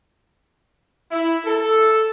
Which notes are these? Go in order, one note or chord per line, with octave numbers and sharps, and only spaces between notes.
E4
A4